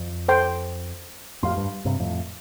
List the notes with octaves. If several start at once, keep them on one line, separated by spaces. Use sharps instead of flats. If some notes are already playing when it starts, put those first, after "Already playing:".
Already playing: F2
A4 C5 G5 C6
F2 A2 G4 F5 C6
G2
G2 C3
F2 A2